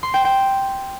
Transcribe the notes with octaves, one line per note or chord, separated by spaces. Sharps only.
C6
G5
G5